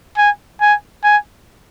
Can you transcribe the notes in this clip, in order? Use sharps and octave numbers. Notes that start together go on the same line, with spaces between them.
G#5
G#5
G#5